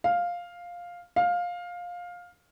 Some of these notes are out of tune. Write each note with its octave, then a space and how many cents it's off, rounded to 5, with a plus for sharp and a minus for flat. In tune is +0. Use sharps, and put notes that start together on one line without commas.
F5 +5
F5 +15